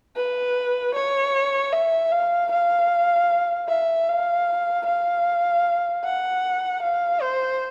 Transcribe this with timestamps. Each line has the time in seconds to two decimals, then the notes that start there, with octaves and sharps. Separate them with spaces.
0.16 B4
0.95 C#5
1.72 E5
2.12 F5
2.51 F5
3.68 E5
4.08 F5
4.86 F5
6.04 F#5
6.82 F5
7.22 C5